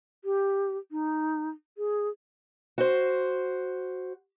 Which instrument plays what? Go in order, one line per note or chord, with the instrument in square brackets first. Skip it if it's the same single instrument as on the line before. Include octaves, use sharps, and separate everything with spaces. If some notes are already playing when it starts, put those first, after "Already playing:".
[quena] G4
D#4
G#4
[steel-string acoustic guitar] F#4 C5